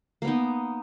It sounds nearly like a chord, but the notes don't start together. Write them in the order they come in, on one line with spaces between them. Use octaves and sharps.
A#3 B3 D#4